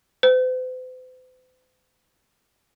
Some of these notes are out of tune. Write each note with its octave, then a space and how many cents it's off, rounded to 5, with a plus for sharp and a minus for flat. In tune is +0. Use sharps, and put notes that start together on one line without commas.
C5 -45